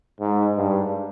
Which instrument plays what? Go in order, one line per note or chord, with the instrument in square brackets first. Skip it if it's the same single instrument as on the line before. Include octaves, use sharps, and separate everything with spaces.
[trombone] G#2
G2